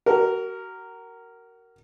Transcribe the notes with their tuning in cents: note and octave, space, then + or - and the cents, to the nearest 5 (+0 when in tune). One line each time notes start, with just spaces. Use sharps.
F#4 +35 A#4 -10